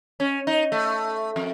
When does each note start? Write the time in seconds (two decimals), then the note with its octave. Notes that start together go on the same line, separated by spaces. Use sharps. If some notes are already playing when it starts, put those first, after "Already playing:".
0.20 C#4
0.47 D#4
0.72 A3
1.36 F2